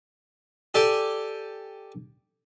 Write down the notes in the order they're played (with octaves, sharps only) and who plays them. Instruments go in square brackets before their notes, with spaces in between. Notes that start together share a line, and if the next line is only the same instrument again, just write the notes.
[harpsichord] G4 A4 D5 G5 G#5